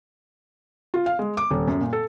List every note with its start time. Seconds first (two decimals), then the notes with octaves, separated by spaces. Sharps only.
0.94 F4
1.06 F5
1.19 G#3
1.37 D6
1.50 D#1
1.67 F#2
1.81 A#2
1.93 A4